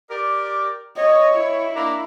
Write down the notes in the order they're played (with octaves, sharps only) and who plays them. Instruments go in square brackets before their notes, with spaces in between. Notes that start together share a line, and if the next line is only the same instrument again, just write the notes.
[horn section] G4 A#4 D5
[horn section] C#5 [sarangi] D#5
[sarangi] E4
[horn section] A#3 D4 A#5